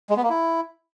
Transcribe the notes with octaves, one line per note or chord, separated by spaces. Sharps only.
G#3
B3
A#3
E4